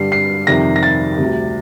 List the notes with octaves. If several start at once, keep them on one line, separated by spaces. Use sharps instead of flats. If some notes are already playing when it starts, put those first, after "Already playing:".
Already playing: G2 D3 G3 C7
C7
F2 C3 D#3 G3 A#6
A#6
A6
D2 C3 G3